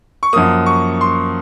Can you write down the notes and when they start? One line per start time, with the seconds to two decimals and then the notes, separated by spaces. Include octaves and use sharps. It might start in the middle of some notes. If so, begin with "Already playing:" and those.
0.23 C#6
0.33 F#2 F3 A#3 D#6
0.66 C#6
1.01 C6